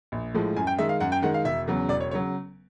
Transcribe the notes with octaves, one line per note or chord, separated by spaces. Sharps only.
A#1
A2 F3 G#3
F#2 G#5
G5
D#3 G#3 E5
F5
F#2 F#5
G5
D#3 G#3 F#5
F5
E1 E5
E2 C#3 F#3
E1 D5
C#5
C#3 F#3 C#5